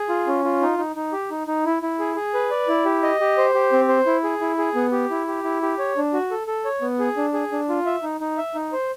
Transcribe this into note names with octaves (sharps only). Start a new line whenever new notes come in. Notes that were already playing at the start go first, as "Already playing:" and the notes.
Already playing: G#4
F4
C#4
F4
D#4
D#4
D#4
G4
D#4
D#4
E4
E4
G#4
G#4
B4
D5
E4
G4
D#5
G4
C5
G4
C4
C5
E4
G#4
E4
G#4
B3
G4
E4
G4
E4
G4
C#5
D4
F#4
A4
A4
C#5
B3
G#4
D4
G#4
D4
F4
E5
D#4
D#4
E5
D#4
C5